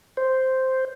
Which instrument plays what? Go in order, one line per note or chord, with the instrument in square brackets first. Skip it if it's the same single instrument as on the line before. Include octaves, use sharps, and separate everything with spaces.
[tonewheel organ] C5